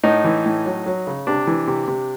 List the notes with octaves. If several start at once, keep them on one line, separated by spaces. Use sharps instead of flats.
A2 D#4
E3
A2
F#3
F#3
C#3
C3 D4
E3
C3
C3